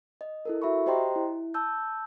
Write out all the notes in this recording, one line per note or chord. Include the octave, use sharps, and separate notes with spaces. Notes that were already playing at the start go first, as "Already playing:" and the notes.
D#5
E4 A4 A#4
F#4 E5 B5 C#6
G4 C5 D#5 G5 A#5 C6
E4
A5 E6 G6